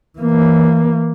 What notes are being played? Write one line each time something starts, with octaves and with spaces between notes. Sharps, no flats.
E3 A#3